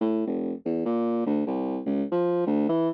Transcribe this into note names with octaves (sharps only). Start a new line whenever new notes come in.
A2
F1
E2
A#2
D2
C2
C#2
F3
D2
E3